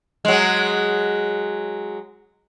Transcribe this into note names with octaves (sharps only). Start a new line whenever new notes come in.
F#3 G#3